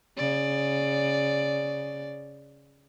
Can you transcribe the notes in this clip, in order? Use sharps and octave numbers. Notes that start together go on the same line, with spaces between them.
C#3 D5